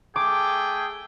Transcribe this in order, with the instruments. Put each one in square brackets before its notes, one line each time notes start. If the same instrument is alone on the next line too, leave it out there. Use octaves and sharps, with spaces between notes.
[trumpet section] A3 G#4 G5 [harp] D6